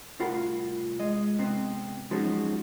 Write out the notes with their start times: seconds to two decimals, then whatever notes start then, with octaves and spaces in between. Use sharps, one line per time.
0.19 C2 A2 F4 A#4 F#5 B5
1.00 G#3 D#5
1.38 G#2 C3 B3 C4
2.11 F3 F#3 G#3 C#4 D#4 F#4